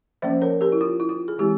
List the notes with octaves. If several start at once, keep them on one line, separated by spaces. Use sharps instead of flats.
F3 A#3 C#4 C5 E5
A#4 C#5
G4 A#4
E4
F4
E4
F4
G#4
E3 G#3 C4 E4 G4